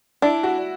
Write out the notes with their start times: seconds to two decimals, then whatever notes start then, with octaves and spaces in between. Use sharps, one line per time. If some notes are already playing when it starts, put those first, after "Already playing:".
0.22 D4 E4
0.43 F#4